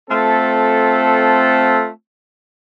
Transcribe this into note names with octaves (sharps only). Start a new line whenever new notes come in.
A3 C4 F4 A4